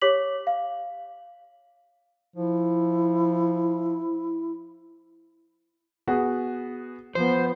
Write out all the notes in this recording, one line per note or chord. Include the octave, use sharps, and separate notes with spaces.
G4 C#5 D6 B6 F#7
F5
F3 E4
B3 F#4 G#4
F3 B3 C5